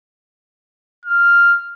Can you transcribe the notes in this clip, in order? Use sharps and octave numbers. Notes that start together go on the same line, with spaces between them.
F6